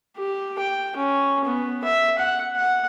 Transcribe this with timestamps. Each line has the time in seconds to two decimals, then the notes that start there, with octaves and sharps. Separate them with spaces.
0.17 G4
0.59 G5
0.97 C#4
1.45 B3
1.84 E5
2.19 F#5
2.56 F#5